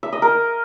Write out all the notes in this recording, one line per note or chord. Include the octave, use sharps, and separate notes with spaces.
E5
D#5
A#4